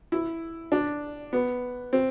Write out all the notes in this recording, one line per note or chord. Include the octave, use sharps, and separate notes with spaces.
E4
D4
B3
C4